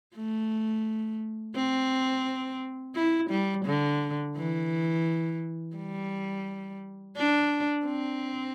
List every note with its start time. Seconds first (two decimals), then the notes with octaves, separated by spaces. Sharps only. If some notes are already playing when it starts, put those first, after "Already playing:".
0.16 A3
1.55 C4
2.95 E4
3.30 G3
3.65 D3
4.36 E3
5.76 G3
7.16 D4
7.86 C4